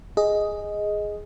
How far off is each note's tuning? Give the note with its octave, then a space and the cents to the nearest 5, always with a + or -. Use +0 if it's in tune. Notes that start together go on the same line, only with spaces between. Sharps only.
G#4 +0 D#5 +5